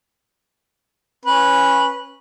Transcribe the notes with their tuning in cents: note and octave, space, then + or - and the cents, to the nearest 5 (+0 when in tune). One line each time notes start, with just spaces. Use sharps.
C#4 -15 B4 -10